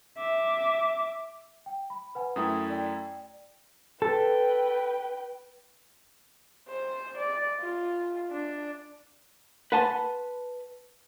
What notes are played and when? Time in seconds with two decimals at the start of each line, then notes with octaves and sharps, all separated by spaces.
0.18 E5 D6
1.66 G5
1.90 B5
2.15 B4 F#5 G#5
2.36 F#2 A3 E4 G5 D#6
2.70 D5 G5
4.02 A4 B4 G5
6.68 C5
7.17 D5
7.61 F4
8.31 D4
9.72 B4 F#5 G#5 A5 C6